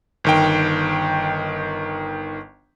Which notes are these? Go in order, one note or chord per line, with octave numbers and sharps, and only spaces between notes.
G1 D#3 G5